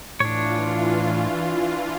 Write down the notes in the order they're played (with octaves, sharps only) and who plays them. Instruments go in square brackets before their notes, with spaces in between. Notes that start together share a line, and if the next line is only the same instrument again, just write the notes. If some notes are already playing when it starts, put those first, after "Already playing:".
[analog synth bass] A2 [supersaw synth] E3 F4 [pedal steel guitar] D4 C#5